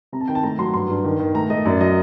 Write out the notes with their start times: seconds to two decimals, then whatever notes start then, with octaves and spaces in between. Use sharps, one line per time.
0.12 C3 A#5
0.21 A5
0.28 D#3 G5
0.35 A5
0.43 A3 A#5
0.59 F#3 C6
0.74 G2 C6
0.89 G2
1.04 D#3
1.19 D#3
1.35 A3 A#5
1.50 A3 D#5
1.65 F#2 D5
1.80 F#3 D#5